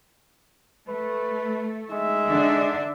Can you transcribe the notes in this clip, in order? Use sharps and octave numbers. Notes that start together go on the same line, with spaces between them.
A3 B4
G#3 D#4 E5
D3 D4